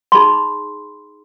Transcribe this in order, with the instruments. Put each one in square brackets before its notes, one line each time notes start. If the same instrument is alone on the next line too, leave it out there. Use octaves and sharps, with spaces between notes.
[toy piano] D#4 G#4 B5 C6